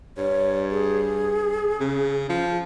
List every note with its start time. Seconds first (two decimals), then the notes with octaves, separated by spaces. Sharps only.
0.18 G2 C#5
0.71 G#4
1.80 C#3
2.30 F3